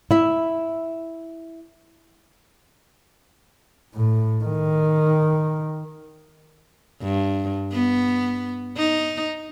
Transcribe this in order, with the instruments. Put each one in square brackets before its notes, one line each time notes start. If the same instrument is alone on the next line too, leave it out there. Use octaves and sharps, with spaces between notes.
[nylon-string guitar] E4 E5
[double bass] A2
D#3
[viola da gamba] G2
B3
D#4